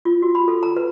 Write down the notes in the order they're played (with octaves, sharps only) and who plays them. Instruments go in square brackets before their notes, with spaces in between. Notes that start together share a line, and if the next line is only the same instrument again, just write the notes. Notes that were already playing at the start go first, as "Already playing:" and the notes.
[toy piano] F4
F#4
B5
A4
A#5
B4